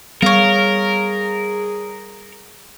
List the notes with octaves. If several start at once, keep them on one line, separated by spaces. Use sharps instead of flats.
G3 B3 G#4 A#4 C#5 F5